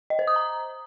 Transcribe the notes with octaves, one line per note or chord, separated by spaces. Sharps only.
D#5
C5
D#6
A#5